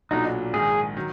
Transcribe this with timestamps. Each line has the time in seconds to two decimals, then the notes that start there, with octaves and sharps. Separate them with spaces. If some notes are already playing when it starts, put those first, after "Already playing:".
0.11 B1 A#2 F#3 D4 D#4 F#4
0.54 A#1 G#2 D#3 G#4
0.97 D#3 F#3